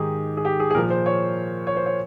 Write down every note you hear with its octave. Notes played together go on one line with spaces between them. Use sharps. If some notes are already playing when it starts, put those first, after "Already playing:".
Already playing: G#2 D#3 G4 G#4
G#4
G4
G#4
G#4
A#2 F3 A#4
C5
C#5
C#5
C5
C#5